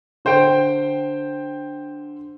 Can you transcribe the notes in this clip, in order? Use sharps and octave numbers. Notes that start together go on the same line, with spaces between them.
D3 C5 G5 D7